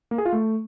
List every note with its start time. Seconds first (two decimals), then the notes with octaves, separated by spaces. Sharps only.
0.11 A#3
0.18 G#4
0.25 F4
0.33 A3